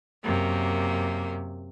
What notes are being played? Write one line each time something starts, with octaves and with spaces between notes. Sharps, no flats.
F#2 C3 A#3